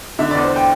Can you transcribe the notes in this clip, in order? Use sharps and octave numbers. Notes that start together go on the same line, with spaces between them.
D3 E5
D5
E2
C5
G5